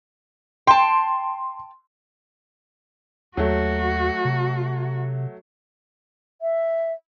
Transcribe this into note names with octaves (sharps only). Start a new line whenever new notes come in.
G5 A5 C6
D#2 F#3 A3 F#4
C3
E5